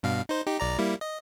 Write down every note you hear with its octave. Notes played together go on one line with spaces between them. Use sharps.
G2 B2 F5
D#4 C5
D#4 G4
B1 D5 A#5
G3 A#3 E4
D#5